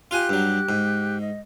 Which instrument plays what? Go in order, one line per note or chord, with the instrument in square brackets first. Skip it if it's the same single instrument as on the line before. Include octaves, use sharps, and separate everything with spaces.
[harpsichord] F4 F5 G#5 [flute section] G4 F#6
[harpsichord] G2 F#3
G#2
[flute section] D#5